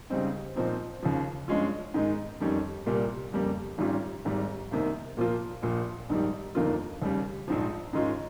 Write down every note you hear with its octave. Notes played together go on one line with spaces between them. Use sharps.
C#2 C#3 G3 C4 D#4
A#2 F3 C4 D#4
D#2 C#3 F3
G2 F3 G#3 C#4 F4
G#2 D#3 G#3 D#4
F2 D#3 G3 C#4
C2 A#2 G3 A#3
F2 C#3 G3 A#3
G#1 G#2 G3 C#4 F4
G#1 G#2 G3
C2 C3 D#3 A#3
A#2 F3 A#3 F4
A#1 A#2 F3
A#1 G#2 D#3 G3
G1 F2 D#3 A#3 F4
D#2 C#3 G3
A#1 G#2 F3
G#2 D#3 G#3 C#4 F4